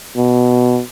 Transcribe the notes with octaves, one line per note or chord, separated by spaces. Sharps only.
B2